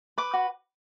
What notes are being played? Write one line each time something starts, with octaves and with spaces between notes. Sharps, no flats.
B4 D6
F#4